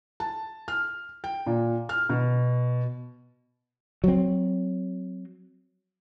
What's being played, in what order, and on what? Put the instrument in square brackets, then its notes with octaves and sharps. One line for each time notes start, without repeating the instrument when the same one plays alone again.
[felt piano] A5
F6
G5
A#2
F6
B2
[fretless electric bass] F#3 C4